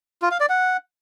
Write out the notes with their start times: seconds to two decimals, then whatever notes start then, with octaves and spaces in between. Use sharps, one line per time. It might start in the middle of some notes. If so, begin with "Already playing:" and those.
0.22 F4
0.31 F5
0.40 D5
0.49 F#5